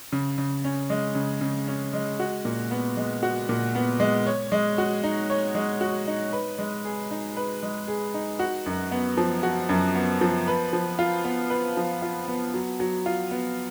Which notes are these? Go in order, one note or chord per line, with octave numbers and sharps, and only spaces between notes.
C#3
C#3
C#4
G#3
C#3
C#3
C#4
G#3
F#4
A#2
B3
G#3
F#4
A#2
B3
G#3
C#5
G#3
F#4
D#4
C#5
G#3
F#4
D#4
B4
G#3
G#4
D#4
B4
G#3
G#4
D#4
F#4
F#2
B3
F3
F#4
F#2
B3
F3
B4
F3
F4
B3
B4
F3
F4
B3
F#3
F#3
F4
B3